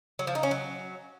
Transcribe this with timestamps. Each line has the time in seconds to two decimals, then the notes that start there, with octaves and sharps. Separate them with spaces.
0.19 F#3
0.27 F3
0.35 D#4
0.43 C#4
0.51 F#3